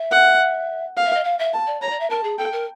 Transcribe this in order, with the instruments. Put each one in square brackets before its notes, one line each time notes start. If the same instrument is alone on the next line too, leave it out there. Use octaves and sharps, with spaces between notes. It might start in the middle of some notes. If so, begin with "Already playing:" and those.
Already playing: [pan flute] E5
[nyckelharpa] F#5
F5
[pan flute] E5
D#5
F5
E5
[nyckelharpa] A5
[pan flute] D5
[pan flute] C#5 [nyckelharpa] A#5
[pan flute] D5
E5
[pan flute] A#4 [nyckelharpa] A5
[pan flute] G#4
[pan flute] A4 [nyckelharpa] G5
[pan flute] A#4